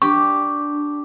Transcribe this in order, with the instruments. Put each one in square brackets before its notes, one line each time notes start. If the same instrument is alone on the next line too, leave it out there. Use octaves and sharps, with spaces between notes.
[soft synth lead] D4 [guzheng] G4 [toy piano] C#6